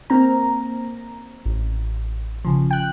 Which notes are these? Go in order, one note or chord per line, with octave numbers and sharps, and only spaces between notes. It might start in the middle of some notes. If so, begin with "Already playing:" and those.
A#3 C4 A#5
A1
C#3 F3
G5 F#6